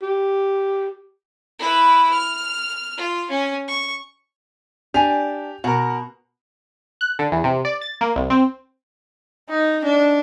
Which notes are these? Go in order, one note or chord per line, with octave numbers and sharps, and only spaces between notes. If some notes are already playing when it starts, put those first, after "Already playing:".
G4
E4 B4
F6
F4
C#4
C#6
D4 G4 G#5 F7
B2 F#4 A#4
F#6
D3
E2
C3
D5
A6
A#3
C2
C4
D#4
D4